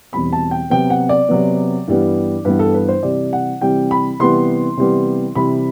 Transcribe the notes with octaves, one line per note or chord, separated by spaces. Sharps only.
E2 B2 G3 C4 B5
A5
G5
C3 F#3 B3 G5
F#5
D5
C3 F#3 B3
G2 E3 G3 B3
G2 E3 G3 B3 B4
A4
B4
C5
C3 E3 G3 C4 D5
F#5
C3 E3 G3 C4 G5
B5
C3 E3 G3 B3 C6
C3 E3 G3 B3
C3 E3 G3 C4 B5